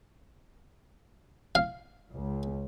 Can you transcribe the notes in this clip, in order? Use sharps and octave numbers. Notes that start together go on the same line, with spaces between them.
F5
C#2